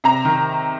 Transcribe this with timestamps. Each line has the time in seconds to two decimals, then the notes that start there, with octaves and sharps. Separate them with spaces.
0.04 C3 A#5
0.25 D#3